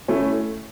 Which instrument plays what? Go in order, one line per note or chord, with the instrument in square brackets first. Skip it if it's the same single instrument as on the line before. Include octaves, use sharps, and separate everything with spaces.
[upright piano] A3 C#4 E4